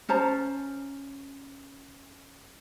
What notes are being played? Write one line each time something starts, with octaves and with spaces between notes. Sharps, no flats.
C#4 C5 A5 A#5